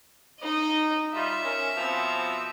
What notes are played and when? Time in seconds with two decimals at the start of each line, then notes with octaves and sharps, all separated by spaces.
0.40 D#4 D#5
1.14 G3 D#4 F4 E5
1.44 C#4 A#4
1.76 B2 F3 C4